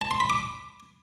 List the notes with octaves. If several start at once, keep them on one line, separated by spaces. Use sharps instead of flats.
A5
C6
B5
D6